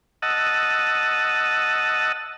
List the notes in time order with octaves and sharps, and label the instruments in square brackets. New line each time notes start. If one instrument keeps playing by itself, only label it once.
[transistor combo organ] D#5 F#5 A5 E6